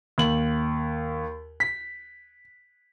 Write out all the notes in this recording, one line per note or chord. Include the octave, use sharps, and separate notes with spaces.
D#2 F#7
B6